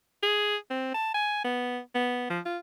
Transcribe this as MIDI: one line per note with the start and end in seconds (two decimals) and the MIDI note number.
0.23 0.56 68
0.70 0.90 60
0.94 1.13 81
1.14 1.42 80
1.44 1.80 59
1.95 2.27 59
2.30 2.40 53
2.46 2.58 65